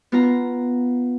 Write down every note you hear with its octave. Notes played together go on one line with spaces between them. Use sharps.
B3 F4 A#5